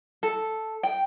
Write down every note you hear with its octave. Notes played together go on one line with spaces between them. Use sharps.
A4
G5